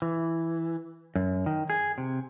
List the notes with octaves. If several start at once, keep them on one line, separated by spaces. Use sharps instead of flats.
E3
F#2
D#3
G#4
C3